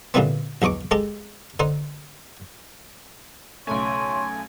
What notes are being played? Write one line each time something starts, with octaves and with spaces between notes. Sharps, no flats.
A#2 D3 E3 G3 B3 C4
B1 E2 D#5 C#6 D6
G#3 G4 A4 D#5
D3 D#4 C5
B1 C#3 A3 C#5 G#5 C6